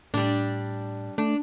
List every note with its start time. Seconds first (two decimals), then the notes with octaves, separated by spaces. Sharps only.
0.14 A2 G3 D4
1.18 A3 D4